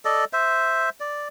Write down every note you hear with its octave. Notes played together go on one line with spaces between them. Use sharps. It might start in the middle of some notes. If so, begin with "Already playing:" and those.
A4 D5 D#5
C5 E5
D5